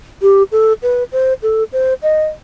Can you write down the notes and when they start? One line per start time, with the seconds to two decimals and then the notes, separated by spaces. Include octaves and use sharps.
0.22 G4
0.52 A4
0.83 B4
1.12 C5
1.43 A4
1.73 C5
2.03 D#5